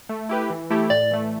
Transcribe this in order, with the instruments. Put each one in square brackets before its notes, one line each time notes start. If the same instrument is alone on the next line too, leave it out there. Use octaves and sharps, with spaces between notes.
[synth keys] A3
E4 G4 B4
E3
A3 E4 G4
[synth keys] A2 [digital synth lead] D5
[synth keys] E3 A3